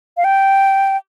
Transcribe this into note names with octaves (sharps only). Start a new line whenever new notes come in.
F5
G5